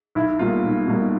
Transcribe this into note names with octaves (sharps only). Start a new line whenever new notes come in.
B1 E4
B2 G3 A#3 F4
B1
B2 G3 A#3